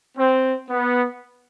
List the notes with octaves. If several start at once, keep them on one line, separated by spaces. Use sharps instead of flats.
C4
B3